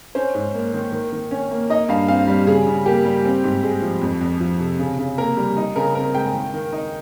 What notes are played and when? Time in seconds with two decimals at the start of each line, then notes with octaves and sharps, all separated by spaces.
0.15 C#4 C5
0.35 G#2
0.54 A#3
0.74 D#3
0.92 D#3
1.12 D#3
1.31 C#4
1.51 A#3
1.70 D#4 D#5
1.89 G2 F5
2.08 C4 F5
2.27 G3
2.47 C#3 G#4
2.66 C#3
2.86 A#3 G4
3.05 G3
3.25 C4
3.44 G#2
3.63 G#3
3.82 F3
4.02 F2
4.21 F2
4.40 F3
4.60 C3
4.79 C#3
4.98 C#3
5.18 A#3 A#4
5.37 G3
5.57 D#4
5.76 C#3 A#4
5.95 C4 A#4
6.14 G#3 G5
6.34 D#3
6.54 D#3
6.72 D#4